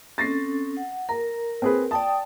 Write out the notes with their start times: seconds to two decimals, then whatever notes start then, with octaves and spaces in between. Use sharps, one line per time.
0.18 C4 C#4 A4 A6 A#6 C7
0.77 F#5
1.09 A#4 A#5
1.62 C4 G#4 B4
1.91 D5 G5 A5 D#6